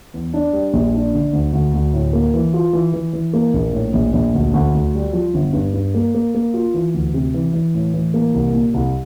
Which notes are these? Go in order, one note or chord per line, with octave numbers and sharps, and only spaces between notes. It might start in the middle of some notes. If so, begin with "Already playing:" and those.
E2
D4
G3
A#1
D4
D3
D2
D2
D2
A2
A#3
E3
F4
E3
E3
E3
A#3
A#1
A2
A#1
A#1
D2
D2
D2
G3
F3
G1
G2
G2
A#3
A#3
A#3
F4
E3
D2
C3
E3
E3
A2
E3
A#3
C2
A#2
C2